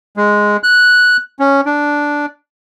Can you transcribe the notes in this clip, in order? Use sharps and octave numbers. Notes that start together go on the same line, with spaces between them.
G#3
F#6
C#4
D4